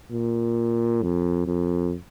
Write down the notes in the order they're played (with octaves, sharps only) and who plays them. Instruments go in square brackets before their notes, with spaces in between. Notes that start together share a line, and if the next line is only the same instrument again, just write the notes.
[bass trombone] A#2
F2
F2